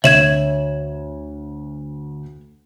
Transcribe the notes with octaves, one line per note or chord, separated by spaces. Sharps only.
D2 C#5 E5 G#6 E7 F#7